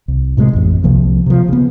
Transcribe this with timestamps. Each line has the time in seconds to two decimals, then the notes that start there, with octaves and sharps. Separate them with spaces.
0.08 C2
0.37 A2 C3 D#3 G#3
0.53 A1 F2
0.84 C2 C3 F3 A#3
1.26 C3 F3
1.48 C#3 B3